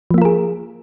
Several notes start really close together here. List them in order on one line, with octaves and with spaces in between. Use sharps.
F3 A#3 F4 A#4 G#4